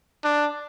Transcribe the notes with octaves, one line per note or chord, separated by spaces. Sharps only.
D4